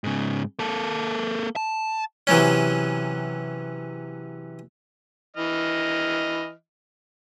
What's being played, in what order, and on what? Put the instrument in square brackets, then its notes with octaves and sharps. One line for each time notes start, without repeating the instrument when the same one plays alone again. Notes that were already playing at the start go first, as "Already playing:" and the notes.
[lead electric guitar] G#2 C#3
A#3 A4
A5
[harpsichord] C3 E3 F#3 C#4
[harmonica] E3 D#5 F6